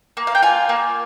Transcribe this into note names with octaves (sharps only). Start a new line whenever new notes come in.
A#3
F5
G5
F4 G#5
A#3